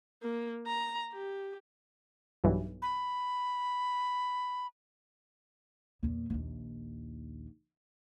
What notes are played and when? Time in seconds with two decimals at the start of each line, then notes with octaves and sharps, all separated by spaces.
0.22 A#3
0.66 A#5
1.12 G4
2.44 B1 G2 E3
2.82 B5
6.03 E2 A#2
6.30 A#1 D#2